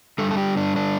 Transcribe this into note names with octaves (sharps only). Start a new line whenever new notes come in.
G2 D3 G3 A4
A4
G4
D4
D4